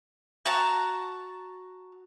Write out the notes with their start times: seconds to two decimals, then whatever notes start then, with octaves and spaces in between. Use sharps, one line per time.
0.45 F#4 A5 A#5